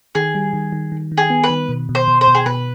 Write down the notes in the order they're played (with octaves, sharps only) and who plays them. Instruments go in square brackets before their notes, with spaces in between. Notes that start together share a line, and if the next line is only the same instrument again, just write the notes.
[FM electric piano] D#3 [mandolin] G#4
[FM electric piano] G3
D#3
D#3
D#3
D#3
[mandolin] G#4
[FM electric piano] B3
[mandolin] B4
[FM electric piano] D#3
B2
B2
[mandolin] C5
[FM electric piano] B2
[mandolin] C5
[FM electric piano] B2
[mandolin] G#4
[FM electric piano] B2 [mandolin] B4